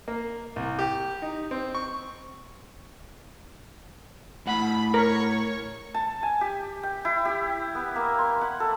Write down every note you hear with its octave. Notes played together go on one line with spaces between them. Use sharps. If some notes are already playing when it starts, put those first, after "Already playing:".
A#3
C2
G4
D#4
C4
C#6
A2 F#5 B5
A#4 C#5 C#6
A5
G#5
G4
G5
E4
G4
B3
A#3
C6
F#5
A4